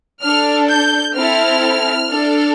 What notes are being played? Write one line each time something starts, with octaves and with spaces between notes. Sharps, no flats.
D4 A4 F6
G6
C4 E4 A4 F6
D4 A4